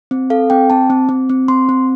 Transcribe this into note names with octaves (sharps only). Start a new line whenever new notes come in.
C4
A4 F5
C4 G5
C4 A5
C4
C4
C4
C4 C6
C4